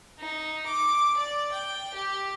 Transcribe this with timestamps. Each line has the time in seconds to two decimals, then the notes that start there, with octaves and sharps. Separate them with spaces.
0.19 D#4
0.66 D6
1.17 D5
1.52 G5
1.94 G4